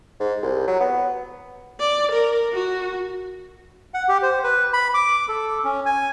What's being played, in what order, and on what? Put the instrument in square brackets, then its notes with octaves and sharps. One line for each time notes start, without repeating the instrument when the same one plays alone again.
[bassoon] G#2
C2
F#3
B3
[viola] D5
A#4
F#4
[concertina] F#5
G4
C5
B4
B5
D6
A4
C#4
G#5